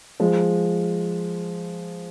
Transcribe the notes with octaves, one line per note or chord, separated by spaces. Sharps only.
F3 G#3